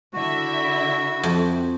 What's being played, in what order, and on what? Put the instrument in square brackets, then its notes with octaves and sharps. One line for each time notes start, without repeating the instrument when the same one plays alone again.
[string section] D3 E4 E5 [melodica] F#4
[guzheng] F2